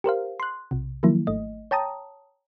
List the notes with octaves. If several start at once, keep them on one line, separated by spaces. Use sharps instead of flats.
G4 A#4 C5 F5
C6 F#6
B1 C3
D#3 F3 F#3 A#3 E4
G#1 A3 D#5
C#5 G5 A5 A#5 D#6